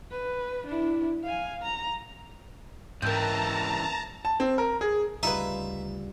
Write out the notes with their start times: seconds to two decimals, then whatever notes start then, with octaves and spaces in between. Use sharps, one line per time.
0.11 B4
0.67 D4 E4
1.23 F5 G#5
1.62 A#5
3.02 C#2 G#2 E3 A#4 G5 A5 A#5
4.25 A5
4.40 C4
4.58 A#4
4.81 G#4
5.23 D2 C#3 G3 D#4 F4 B4 E5